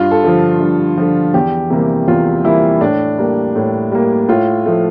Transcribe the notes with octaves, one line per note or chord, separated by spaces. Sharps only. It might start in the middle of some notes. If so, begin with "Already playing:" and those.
Already playing: G2 F4
A4
D3 F3
G2
D3 F3
E2 G4
C3 E3 G3 A#3
E2 F4
C3 E3 G3 A#3 E4
A2 D4
G3 A#3
A2
G3 A#3
A2 F4
F3 A3